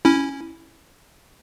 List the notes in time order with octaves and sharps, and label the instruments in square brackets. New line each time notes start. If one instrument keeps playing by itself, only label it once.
[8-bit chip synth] C#4 E4